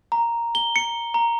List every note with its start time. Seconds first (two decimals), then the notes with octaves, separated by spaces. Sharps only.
0.12 A#5
0.55 G7
0.76 C#7
1.14 A#5